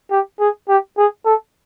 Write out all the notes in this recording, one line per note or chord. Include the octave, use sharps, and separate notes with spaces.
G4
G#4
G4
G#4
A4